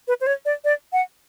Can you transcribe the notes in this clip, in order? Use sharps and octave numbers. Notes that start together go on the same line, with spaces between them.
B4
C5
C#5
D5
D5
F#5